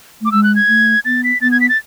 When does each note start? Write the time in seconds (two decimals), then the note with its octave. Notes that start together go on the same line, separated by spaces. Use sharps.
0.21 A3 D6
0.32 G#3 E6
0.44 F#6
0.56 G#6
0.68 A3
1.05 B3 A6
1.24 B6
1.41 B3 A6
1.51 G#6
1.61 B6
1.69 A6